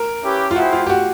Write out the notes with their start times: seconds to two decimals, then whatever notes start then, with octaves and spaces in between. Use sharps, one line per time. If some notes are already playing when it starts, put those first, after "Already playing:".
Already playing: A#4
0.22 C#4 E4 G4 B4
0.51 F4
0.55 E4 F#4 G#4 C5 E5 G5
0.73 F4
0.86 G4
0.90 F#4